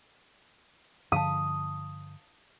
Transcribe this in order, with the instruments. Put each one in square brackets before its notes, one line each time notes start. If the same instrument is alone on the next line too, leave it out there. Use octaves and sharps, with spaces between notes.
[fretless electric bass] G2 D3 F3 [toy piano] F5 A5 [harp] D#6